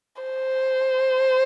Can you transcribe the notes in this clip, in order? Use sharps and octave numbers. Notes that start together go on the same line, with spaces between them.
C5